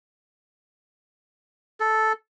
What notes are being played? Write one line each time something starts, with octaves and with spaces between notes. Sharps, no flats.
A4